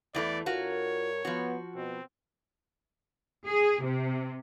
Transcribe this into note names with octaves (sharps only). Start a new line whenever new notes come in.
E2 E3 A3 D5
G2 F4 F#4 A#4 C#5
F3 B3 F#4
B2 C4
G#4
C3